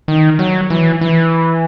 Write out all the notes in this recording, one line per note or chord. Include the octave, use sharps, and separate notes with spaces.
D#3
F#3
E3
E3